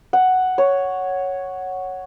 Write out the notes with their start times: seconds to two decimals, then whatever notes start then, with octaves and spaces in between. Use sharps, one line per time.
0.13 F#5
0.58 C#5